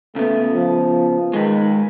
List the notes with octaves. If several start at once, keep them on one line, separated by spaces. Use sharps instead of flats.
C#3 A3 B3
F3
D#3 G#3 B4